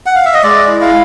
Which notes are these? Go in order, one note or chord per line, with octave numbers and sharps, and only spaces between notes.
F#5
F5
E5
D#5
G#3 D5
E4
F5